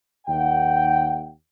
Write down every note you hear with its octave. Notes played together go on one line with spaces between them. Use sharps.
D#2 F#5 G5